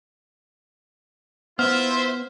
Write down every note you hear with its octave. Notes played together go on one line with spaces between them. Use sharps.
B3 E4 F4 C5 E5 F6